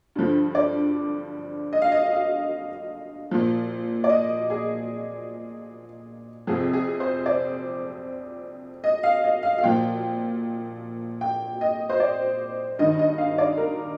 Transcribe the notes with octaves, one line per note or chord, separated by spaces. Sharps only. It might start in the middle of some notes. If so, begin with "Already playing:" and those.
G2 D3 F3
D5
D#5
F5
D#5
F5
A#2 F3
D5
D#5
G#4
F2 C3 F3 G#4
G#4
C5
D5
D#5
F5
D#5
F5
F5
A#2 F3 G5
G5
D#5
C5
D5
G2 D#3 D#5
D#5
F5
D5
A#4